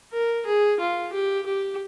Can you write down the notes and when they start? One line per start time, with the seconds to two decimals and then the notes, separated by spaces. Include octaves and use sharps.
0.12 A#4
0.46 G#4
0.80 F4
1.13 G4
1.46 G4